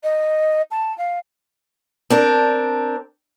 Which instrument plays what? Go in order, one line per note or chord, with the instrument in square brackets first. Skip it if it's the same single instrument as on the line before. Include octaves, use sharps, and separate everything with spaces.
[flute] D#5
A5
F5
[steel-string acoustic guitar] C4 D4 A#4